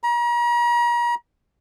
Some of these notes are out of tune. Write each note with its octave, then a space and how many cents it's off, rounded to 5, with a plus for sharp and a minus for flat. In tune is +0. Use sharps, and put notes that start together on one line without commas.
A#5 +40